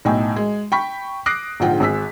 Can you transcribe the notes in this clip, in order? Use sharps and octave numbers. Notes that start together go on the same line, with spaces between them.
B1 A2 D#4 G5 G#5
G#3
G5 B5 C#6 B6
D6 D#6 F#6 A#6 C7 D7
A#1 G#2 D3 F4 F#5 G5
G#1 G#4 E6 B6